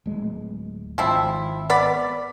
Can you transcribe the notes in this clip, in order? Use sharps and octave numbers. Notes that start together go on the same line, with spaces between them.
D1 G#3
G#1 F3 C4 E4
B3 D5 B5